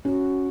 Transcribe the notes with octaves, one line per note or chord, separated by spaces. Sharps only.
C#4 F#4